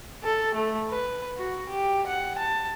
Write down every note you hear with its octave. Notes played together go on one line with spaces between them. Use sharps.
A4
A3
B4
F#4
G4
F#5
A5